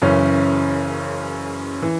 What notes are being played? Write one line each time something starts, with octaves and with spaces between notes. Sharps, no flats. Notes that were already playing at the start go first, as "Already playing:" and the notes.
F#1 F#2 C#3 E3 C#4
E3